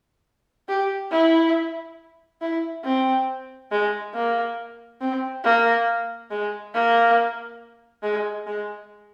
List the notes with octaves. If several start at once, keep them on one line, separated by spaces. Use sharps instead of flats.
G4
E4
E4
C4
G#3
A#3
C4
A#3
G#3
A#3
G#3
G#3